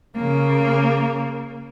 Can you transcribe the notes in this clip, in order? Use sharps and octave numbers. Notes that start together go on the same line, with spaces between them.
C#3 A#3